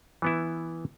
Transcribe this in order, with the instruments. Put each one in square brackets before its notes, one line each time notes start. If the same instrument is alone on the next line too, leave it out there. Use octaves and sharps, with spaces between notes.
[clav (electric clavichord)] E3 B3 E4